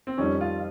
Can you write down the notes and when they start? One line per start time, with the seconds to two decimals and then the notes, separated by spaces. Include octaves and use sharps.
0.07 C4
0.18 F2 D#3 G3 C#4
0.41 F4